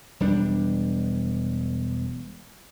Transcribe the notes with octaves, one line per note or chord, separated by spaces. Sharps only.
E1 G3 D4